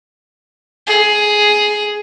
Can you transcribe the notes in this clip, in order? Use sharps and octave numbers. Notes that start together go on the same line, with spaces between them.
G#4